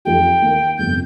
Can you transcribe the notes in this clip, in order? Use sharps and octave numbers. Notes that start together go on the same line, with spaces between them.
F2 F3 D#4 G4 G5
D#2 D#3 A#3
G1 F2 C3 G6